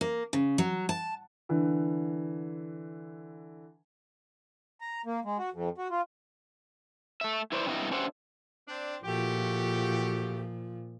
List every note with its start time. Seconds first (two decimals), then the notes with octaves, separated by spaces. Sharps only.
0.01 A#3
0.33 C#3
0.58 F#3
0.89 A5
1.49 D3 E3
4.81 A#5
5.06 A#3
5.25 G#3
5.38 F#4
5.53 F2
5.78 F#4
5.91 F4
7.21 A3 E5
7.52 E4 B4 C5 D5
7.65 G2 C3 G3 B3 E4 D#5
7.91 C#4 D4 G4 C5 E5 F#5
8.67 C4 D4
9.04 A#2 F3 A3 F#4 G4